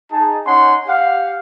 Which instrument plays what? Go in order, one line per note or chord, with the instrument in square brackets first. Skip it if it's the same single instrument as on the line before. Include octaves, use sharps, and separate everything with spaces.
[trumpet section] D#4 G#4 A5
C#4 D#4 C#5 F#5 G#5 C6
G4 F5 F#5